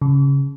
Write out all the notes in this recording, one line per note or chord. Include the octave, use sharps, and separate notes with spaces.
C#3